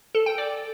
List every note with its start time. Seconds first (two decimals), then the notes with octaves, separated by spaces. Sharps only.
0.15 A4
0.26 G5
0.38 D5